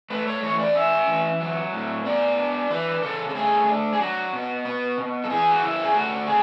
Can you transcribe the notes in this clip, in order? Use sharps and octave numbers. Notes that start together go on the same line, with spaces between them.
A3 B4
C#5
E3 C#5
D5
C#4 E5
E3
F#3
A2
B3 D5
D4
E3 B4
C#3 A4
A4
A3 G#4
D4
G#4
F#3 F#4
B2
B3
B2
A4
E3 G#4
F#4
C#3 E4
G#4
A3 F#4
C#3 G#4